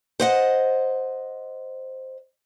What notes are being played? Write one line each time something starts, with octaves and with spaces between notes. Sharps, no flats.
C5 D#5 F#5